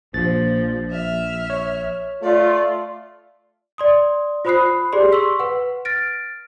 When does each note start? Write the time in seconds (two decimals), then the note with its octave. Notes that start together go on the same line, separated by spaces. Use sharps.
0.14 A#1 A#2 F3 A6
0.90 E5 F6
1.50 C#5
2.23 A3 F4 D5
3.78 D5 C6 D#6
4.45 F4 C5 B5 D#6 F#6 C7
4.93 G4 G#4 D5 C6
5.12 C6 C#6 E6 B6
5.40 B4 F#5
5.85 F6 A6 A#6 D7